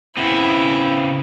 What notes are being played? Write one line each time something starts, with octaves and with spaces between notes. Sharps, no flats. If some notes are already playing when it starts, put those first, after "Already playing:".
C#3 B3 C4 E4